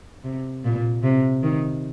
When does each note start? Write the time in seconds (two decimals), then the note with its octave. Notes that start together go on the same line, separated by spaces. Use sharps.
0.24 C3
0.65 A#2
1.03 C3
1.43 D#3